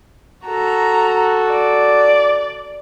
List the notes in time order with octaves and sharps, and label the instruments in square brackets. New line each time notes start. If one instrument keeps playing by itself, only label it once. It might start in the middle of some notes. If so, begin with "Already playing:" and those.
[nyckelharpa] F#4 A4 [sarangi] A#5
[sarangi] D5